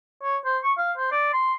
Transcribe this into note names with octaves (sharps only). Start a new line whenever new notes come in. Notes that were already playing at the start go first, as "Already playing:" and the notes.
C#5
C5
C#6
F5
C5
D5
C6